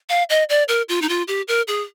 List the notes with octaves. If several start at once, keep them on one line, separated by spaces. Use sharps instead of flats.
F5
D#5
D5
A#4
F4
D#4
F4
G4
A#4
G#4